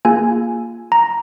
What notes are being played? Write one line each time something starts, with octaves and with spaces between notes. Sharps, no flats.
A#3 F4 G#4 G#5
A#5